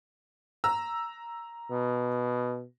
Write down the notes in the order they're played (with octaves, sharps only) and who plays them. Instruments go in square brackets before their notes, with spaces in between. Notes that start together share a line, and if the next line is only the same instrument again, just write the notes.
[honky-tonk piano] A#5 E6
[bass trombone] B2